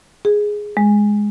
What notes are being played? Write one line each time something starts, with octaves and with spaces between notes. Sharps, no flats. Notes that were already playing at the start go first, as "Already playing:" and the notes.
G#4
G#3